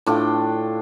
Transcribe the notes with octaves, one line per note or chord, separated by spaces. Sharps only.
A2 D4 F4 G5